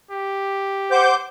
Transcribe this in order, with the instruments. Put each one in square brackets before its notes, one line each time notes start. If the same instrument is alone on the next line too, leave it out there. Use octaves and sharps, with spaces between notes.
[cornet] G4
[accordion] C5 D6 G6 [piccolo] F#5